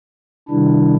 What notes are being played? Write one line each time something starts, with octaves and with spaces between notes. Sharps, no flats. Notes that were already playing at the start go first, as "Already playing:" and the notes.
C3 D#3 G3 D4 E4